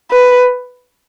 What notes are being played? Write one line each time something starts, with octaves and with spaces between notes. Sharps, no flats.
B4